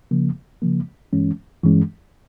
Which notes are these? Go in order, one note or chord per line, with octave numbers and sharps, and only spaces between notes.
C#3 F3 A#3
C#3 F3 A#3
G2 E3 G#3 C#4
G2 E3 G#3 C#4